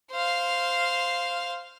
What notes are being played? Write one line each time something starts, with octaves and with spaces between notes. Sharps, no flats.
C5 F5